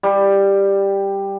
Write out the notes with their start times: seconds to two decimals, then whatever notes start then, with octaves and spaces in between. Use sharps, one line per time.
0.03 G3